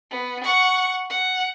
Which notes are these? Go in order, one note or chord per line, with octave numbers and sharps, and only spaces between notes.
B3
F#5 C#6
F#5